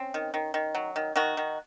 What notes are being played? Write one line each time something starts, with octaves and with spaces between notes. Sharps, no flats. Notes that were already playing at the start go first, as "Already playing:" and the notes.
Already playing: C4 C#4
D#3
D#3
D#3
F#3
D#3
D#3 D#4 F#4
D#3